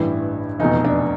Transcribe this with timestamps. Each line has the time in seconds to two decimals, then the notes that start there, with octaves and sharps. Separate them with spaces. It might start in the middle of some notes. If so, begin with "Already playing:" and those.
Already playing: A1 G2 E3 G3 E4
0.59 F1 E2 B2 D#4
0.85 D4